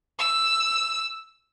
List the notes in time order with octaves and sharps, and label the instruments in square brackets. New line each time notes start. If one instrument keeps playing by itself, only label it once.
[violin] E6